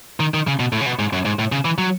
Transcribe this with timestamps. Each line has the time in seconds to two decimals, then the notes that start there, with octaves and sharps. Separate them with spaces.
0.20 D#3
0.34 D#3
0.47 C#3
0.60 B2
0.72 A2
0.81 C#3
0.86 B2
0.99 G#2
1.13 F#2
1.25 G#2
1.39 A2
1.52 C#3
1.65 E3
1.78 F#3